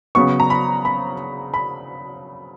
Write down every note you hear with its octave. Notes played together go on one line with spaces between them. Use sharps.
C#3 F#3 B3 C#6
A#5
B5
B5
B5